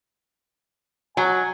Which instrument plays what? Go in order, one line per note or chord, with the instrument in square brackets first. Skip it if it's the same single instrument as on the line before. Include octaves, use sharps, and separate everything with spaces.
[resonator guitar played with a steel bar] F#3 [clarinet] G#5